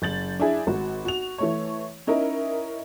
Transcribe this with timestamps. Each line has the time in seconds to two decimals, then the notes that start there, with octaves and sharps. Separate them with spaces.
0.02 F#1 G6 A6 F#7
0.39 D4 E4 G#4
0.67 G#1 F#4
1.05 F#4 F7
1.38 E3 A3 C#5
2.07 C#4 D#4 E4 A#4